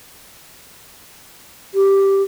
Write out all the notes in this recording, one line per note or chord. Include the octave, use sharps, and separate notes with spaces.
G4